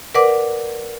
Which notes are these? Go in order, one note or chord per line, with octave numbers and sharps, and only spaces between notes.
A#4 B4 D5 F#5 D6